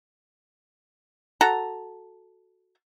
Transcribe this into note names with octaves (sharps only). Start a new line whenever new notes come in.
F#4 A4 A#5